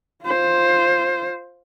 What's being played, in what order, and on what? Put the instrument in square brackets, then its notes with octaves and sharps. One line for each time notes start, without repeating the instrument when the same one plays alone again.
[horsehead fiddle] F4 C5